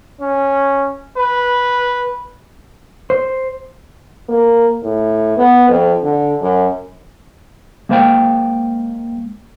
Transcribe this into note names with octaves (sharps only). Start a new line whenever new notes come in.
C#4
B4
C5
A#3
A2
B3
F2
D3
F#2
G#3 A#3 C5 F5 G5